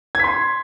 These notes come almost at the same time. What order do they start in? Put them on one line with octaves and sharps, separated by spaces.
G#6 B6 C6